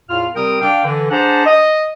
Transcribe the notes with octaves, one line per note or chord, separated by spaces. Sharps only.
E2 A2 F4 F5 F6
C3 G3 C4 A#4 G5 D#6
D4 F5 G5
D3 E3
D4 G#4 C5 F#5 A5 A#5
D#5